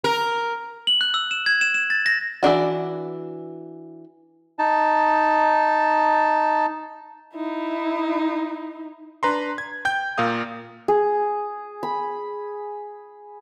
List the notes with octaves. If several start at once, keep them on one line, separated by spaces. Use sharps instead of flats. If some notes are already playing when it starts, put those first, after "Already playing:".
A#4
F#7
F#6
E6
E7
G#6
E7
E7
A6
A#6
E3 F3 D4 F#4
D#4 A5
D#4 E4
D4 B4 A#5 C6
G#6
G5 G6
A#2 A#4 F5 D#6
G#4
B5